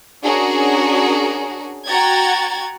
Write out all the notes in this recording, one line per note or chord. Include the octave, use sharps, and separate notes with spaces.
C#4 D4 F#4 G#4 A#4
F#4 F#5 G5 A#5 G#6 A6